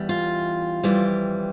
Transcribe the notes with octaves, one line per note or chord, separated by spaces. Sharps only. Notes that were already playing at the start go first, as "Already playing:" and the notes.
Already playing: E2 E3 G3
F4
F2 E3 G3